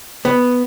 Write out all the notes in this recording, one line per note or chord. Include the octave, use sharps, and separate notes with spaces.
B3